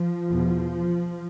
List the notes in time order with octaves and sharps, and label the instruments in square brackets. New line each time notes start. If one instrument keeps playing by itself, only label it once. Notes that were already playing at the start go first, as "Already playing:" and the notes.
Already playing: [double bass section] F3
E2 B2